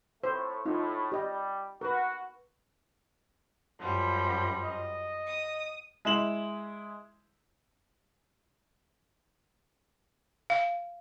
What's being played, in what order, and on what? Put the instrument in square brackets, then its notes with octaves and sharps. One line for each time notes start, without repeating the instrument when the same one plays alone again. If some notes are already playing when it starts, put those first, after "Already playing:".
[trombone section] A2 A3 [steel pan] C5
[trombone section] A2 [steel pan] D#4 F4
[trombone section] G3 [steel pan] G4 D#5 G5
[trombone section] F#4 [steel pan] A#4 B4
[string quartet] F#2 F3 G3
[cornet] D#5
[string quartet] D#6
[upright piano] G#3 E4 E7 F#7
[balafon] F5